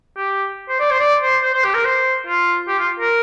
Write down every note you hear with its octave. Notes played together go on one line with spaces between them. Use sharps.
G4
C5
D5
C5
D5
C5
C5
C5
G4
A#4
C5
F4
G4
F4
A#4